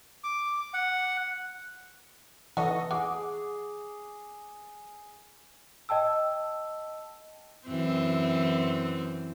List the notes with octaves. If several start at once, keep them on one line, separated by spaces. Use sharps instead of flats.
D6
F#5
E3 A4 D#5 F#5 C#6
G#4 F#5 D6
D#5 G5 A5 E6
F#2 E3 C4